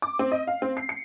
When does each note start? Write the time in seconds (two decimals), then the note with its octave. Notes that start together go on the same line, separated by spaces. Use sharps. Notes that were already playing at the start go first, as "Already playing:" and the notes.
0.02 D6
0.19 C4
0.32 D#5
0.47 F5
0.62 C4
0.77 C7
0.89 C#7